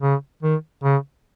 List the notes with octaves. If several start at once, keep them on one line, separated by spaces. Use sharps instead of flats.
C#3
D#3
C#3